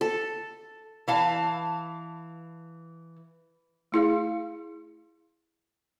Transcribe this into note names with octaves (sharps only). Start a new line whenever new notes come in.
A4
E3 F5 A5
A3 E4 G#4 F5